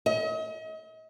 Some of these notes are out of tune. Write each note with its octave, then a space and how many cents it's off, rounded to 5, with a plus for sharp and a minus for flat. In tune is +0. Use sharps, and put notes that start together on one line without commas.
D#5 +40